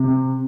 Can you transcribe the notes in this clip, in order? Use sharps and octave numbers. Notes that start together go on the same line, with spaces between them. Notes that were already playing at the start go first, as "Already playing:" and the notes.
Already playing: C3